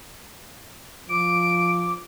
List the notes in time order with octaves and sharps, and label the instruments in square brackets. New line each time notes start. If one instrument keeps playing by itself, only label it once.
[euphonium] F3 [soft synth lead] D6 [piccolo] D7